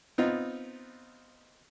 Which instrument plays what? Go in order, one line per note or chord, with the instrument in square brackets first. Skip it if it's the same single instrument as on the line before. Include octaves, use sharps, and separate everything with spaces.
[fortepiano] B3 C4 D#4 F4